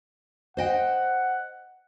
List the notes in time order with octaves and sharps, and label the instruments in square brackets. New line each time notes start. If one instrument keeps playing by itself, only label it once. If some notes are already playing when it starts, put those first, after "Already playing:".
[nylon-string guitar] C5 D#5 G5 [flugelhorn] F#5